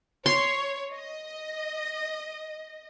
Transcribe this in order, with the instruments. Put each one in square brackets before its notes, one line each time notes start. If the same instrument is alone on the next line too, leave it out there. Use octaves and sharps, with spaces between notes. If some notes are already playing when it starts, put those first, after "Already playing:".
[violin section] C#5 [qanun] C6
[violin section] D#5